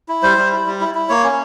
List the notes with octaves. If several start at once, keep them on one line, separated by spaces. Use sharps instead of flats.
E4
G3 C5
G3
E4
G3
E4
E4
A#3 C#5
C#4